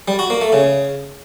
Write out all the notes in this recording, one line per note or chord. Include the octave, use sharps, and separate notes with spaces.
G3
F#4
A#3
A3
C#3